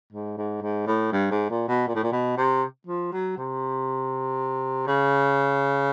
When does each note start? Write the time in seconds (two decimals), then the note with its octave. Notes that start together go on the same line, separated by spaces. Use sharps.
0.13 G#2
0.38 G#2
0.62 G#2
0.87 A2
1.12 G2
1.31 G#2
1.50 A#2
1.68 B2
1.87 A#2
1.95 A2
2.03 A#2
2.12 B2
2.37 C3
2.87 F3
3.13 F#3
3.37 C3
4.87 C#3